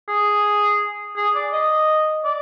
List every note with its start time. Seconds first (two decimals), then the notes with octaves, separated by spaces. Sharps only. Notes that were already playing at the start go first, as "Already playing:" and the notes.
0.08 G#4
1.16 G#4
1.35 D5
1.53 D#5
2.25 D5